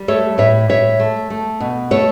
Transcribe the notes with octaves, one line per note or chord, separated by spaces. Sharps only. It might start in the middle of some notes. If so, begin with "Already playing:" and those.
Already playing: G3
A3 A4 C#5
A2 C#5 E5
A2 C#5 E5
A3
A3
B2
A3 A4 C#5